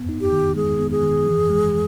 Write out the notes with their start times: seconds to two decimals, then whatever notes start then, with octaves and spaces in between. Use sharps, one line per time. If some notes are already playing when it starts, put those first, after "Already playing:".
Already playing: B3
0.09 D#4
0.21 G4
0.32 D#3
0.56 G#3 G#4
0.79 B3
0.91 G#4
1.03 D#3
1.26 E3
1.50 G#3